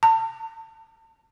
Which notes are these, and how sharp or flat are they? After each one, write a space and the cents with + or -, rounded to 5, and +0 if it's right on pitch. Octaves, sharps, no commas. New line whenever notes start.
A5 +35